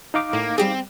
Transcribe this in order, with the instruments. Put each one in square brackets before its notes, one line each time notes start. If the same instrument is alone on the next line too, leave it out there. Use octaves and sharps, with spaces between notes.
[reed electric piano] D#4 F5 D6
[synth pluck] A2 [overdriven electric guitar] A#3
[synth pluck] G3 G4 G#4 [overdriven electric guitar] C4